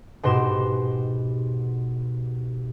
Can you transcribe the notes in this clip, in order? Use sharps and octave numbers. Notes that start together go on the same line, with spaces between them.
G#2 B2 G4 C6 E7